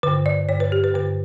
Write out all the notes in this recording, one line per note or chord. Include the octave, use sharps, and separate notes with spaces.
G2 D3 B4
D5
G2 D3 C#5
B4
G4
B4
G2 D3 B4